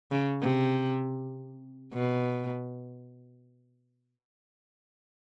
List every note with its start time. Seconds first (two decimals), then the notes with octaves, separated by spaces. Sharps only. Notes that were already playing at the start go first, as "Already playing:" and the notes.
0.11 C#3
0.42 C3
1.93 B2